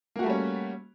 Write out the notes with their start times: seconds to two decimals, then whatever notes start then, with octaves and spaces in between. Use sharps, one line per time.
0.16 A#3
0.19 F#4
0.23 A3
0.26 G3
0.30 C#4